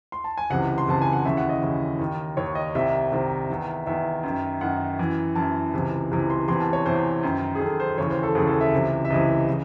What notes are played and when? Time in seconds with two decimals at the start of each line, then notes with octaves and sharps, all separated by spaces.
0.12 C6
0.24 A5
0.38 G#5
0.50 C#2 C3 E3 F#5
0.78 C6
0.88 C#2 C3 E3 A5
1.01 G#5
1.13 F#5
1.25 D#2 C#3 E3 E5
1.37 F#5
1.49 D#5
1.62 D#2 C#3 E3
1.99 D#2 D#3
2.36 D#2 D#3 C#5
2.55 D#5
2.75 C2 C3 D#3 E5
3.12 C2 C3 D#3
3.49 E2 D#3
3.87 E2 D#3 E5
4.23 F#2 D#3
4.61 F#2 D#3 F#5
4.99 F#2 E3
5.36 F#2 E3 A5
5.73 C#2 C3 E3
6.11 C#2 C3 E3
6.30 C6
6.48 E2 C3 E3 C6
6.60 A5
6.73 C#5
6.86 E2 C3 E3 C5
7.23 F#2 D#3
7.55 G#4
7.60 F#2 D#3 A4
7.80 C5
7.98 D#2 C#3 E3 C#5
8.10 C5
8.23 A4
8.35 D#2 C#3 E3 G#4
8.47 A4
8.61 E5
8.72 C#2 C3 E3
9.05 E5
9.10 C#2 C3 E3 D#5
9.49 C#3 E3